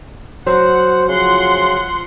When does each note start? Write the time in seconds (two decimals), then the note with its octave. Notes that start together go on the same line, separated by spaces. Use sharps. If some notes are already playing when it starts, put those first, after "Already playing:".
0.47 F#3 C5 F#5
1.08 C#3 F3 F#5 C6